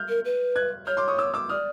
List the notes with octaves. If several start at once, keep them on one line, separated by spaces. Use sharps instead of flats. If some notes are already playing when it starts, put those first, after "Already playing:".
Already playing: F6 G6
A#4
B4
F#6 G#6
C#5 F6 G6
C6 D6
C#6 D#6
D6 E6
D6 E6
D5 D#6 F6